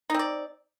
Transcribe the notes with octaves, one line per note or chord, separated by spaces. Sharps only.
C4 D#4 D5